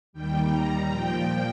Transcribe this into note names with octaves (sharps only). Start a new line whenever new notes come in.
D#2 D#3 G3 G5
D#2 D#3 G3 A#5
A#2 F3 G5